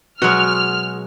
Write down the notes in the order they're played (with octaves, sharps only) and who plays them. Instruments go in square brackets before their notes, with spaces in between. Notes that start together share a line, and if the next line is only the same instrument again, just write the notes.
[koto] B2 F#3 G#3 [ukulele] F#4 [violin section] F6